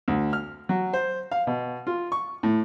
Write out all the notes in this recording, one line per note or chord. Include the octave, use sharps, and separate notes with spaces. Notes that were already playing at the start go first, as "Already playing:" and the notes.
D2
F6
F#3
C5
F5
B2
F4
C#6
A2